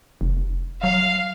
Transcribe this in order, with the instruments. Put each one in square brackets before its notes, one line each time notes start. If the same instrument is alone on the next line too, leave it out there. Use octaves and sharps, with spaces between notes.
[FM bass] F1
[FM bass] F#3 [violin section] F5